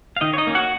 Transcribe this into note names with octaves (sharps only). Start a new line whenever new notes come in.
F5
D#3 D#4 D#5
C#5
D#4 D#5
A#3 C#4
F#4 F#5